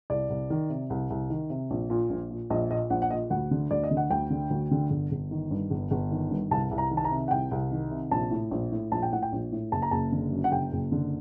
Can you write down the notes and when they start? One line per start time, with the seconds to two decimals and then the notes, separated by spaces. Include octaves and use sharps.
0.10 C2 D5
0.30 C2
0.50 D#3
0.70 C3
0.90 C2
1.10 C2
1.30 D#3
1.50 C3
1.70 A#1
1.90 A#2
2.10 A#1
2.31 A#2
2.50 A#1 D#5
2.70 A#2 D#5
2.90 A#1 F#5
3.02 F#5
3.10 A#2 D#5
3.30 D2 F#5
3.51 D3
3.71 D2 D5
3.83 D#5
3.91 D3
3.97 F#5
4.11 D2 G5
4.30 D3
4.51 D2
4.71 D3
4.90 G1
5.11 G1
5.31 D#3
5.51 G2
5.70 G1
5.91 G1
6.11 D#3
6.31 G2
6.51 C2 A5
6.71 C2
6.78 A#5
6.91 D#3
6.97 A5
7.05 A#5
7.11 C3
7.28 F#5
7.31 C2 G5
7.51 C2
7.71 D#3
7.91 C3
8.11 A#1 A5
8.31 A2
8.51 A#1
8.72 A2
8.92 A#1 A5
9.03 G5
9.12 A2 F#5
9.22 G5
9.32 A#1
9.52 A2
9.72 F#1 A5
9.82 A#5
9.91 F#1 A5
10.12 D3
10.32 F#2
10.44 F#5
10.51 F#1 G5
10.72 F#1
10.92 D3